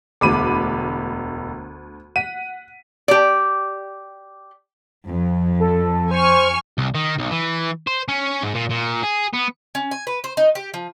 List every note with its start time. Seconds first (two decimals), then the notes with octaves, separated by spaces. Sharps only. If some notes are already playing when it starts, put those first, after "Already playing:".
0.21 E1 D2 B5 D6 D#7
2.16 F#5 B6 D#7
3.08 G4 D5
5.07 F2
5.60 A4
6.11 C5 G#5 C#6 F6
6.78 C2
6.95 D#3
7.19 B1
7.31 E3
7.87 C5
8.08 C#4
8.43 G#2
8.55 A#2
8.71 A#2
9.03 G#4
9.34 B3
9.75 C#4
9.91 G#5
10.07 B4
10.24 C5
10.37 D#4
10.55 G4
10.74 F3